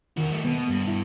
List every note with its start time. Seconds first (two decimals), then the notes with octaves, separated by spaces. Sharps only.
0.17 E2 D#3 F#4
0.31 G3 A3
0.45 B2 B3
0.70 G2
0.87 E4